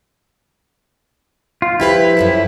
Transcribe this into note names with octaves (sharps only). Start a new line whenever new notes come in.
F4
F3 E4 G4 B4
F#2 F3 A4